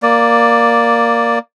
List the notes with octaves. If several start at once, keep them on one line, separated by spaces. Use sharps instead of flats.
A#3 D5